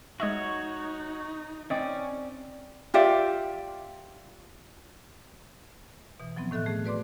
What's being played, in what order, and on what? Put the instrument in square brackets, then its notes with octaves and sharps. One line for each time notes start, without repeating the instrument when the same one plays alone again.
[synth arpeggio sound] G#3 D#5 E5 [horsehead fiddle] D#4 [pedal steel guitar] F#4 C#5
[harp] C4 D5 [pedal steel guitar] C#4 [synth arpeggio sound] D#5
[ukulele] F4 G4 D5 E5
[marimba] B2 E3
F3 F#3 B3 C4
A2 D#3 A4 E5 F#6
A3 G#4
F#4 B4 D5 C6 D6